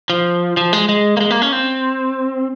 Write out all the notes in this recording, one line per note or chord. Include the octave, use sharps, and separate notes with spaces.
F3
F3
G#3
G#3
A#3
G#3
A#3
C#4
C4